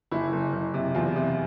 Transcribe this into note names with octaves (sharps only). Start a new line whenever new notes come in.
F#1 E4
F#1
F#1
C3
E2 F4
C3